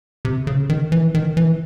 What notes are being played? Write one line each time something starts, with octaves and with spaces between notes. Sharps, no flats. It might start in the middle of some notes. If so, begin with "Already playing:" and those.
C3
C#3
D#3
E3
D#3
E3